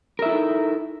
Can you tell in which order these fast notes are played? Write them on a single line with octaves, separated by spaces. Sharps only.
A#4 E5 E4 A4 D#4